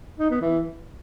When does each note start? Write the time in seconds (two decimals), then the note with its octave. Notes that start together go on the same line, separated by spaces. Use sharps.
0.19 D#4
0.30 B3
0.41 E3